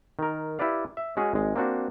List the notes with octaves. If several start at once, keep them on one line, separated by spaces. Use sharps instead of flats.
D#3 A#4
E4 G4 B4 D5 F5
E5
G#3 C#4 F#4 G#4
G#1 G#3
A#3 C4 D4 F#4